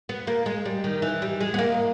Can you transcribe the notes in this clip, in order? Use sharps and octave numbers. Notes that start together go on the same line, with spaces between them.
B3
A#3
G#3
G3
D#3
E3
G3
G#3
B3
A#3